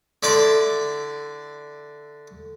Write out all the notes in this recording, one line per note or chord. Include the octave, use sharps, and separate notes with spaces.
D3 E4 D5 C6 D6